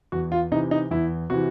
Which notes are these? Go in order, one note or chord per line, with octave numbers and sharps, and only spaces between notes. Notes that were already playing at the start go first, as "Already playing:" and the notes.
E2 F#4
F4
C3 E3 D#4
D#4
E2 E4
C3 E3 F#4